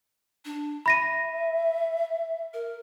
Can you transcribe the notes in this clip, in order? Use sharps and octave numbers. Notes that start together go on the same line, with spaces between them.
D4
E5 B5 A#6 D#7
A#4